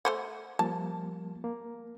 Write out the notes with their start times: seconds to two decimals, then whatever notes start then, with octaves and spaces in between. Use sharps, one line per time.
0.05 A3 C5 F#5
0.59 F3 G3 A#3 A5
1.44 A#3